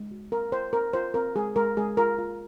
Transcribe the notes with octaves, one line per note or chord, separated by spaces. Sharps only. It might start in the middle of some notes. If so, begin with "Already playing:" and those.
Already playing: G#3
F#4
C4 A#4
F4 C5
C4 A#4
F4 C5
C4 A#4
G#3 G#4
G#3 A#4
G#3 G#4
F4 A#4
F4